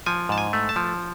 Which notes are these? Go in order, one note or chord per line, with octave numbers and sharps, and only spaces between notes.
F3 G#5
G#2 A5
G#5
A3
A5
F3